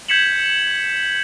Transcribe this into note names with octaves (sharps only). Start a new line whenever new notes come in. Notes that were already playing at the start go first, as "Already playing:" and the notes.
G6 G#6 B6 C#7 E7 F#7